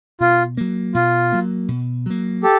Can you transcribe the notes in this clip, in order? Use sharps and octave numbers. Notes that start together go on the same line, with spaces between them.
B2 F4
F#3 A#3
B2 F4
F#3 A#3
B2
F#3 A#3
G4 A4